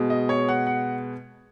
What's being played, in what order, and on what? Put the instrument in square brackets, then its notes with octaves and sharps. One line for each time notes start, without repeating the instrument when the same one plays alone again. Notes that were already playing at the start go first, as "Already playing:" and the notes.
Already playing: [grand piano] B2 G#3
D#5
C#5
F#5
F#5